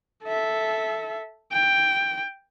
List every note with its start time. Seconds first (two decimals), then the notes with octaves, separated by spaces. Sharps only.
0.24 A4 E5
1.52 G5